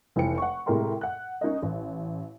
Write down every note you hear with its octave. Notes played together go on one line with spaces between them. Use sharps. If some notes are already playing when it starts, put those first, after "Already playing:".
F1 E3 B4 G5 C#7
F#5 C#6
A2 C3 G#3 A#4 G5 C6
F#5 F#6
C#4 D#4 A#4 D#5
A1